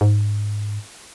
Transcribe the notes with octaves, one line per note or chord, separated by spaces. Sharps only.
G#2